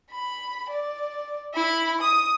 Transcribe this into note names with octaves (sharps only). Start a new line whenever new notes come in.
B5
D5
E4 B5
D#6